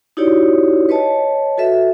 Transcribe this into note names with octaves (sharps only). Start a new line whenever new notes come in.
D#4 E4 F#4 G4 C#5 D5
B4 C#5 D#5 A5
F#4 A4 B4 E5